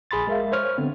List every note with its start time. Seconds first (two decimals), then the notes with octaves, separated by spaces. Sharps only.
0.11 A#1 G#4 B5 C6 A6
0.27 G#3 A#4 E5 F5
0.52 C5 C#5 F6
0.78 D3 B3 C4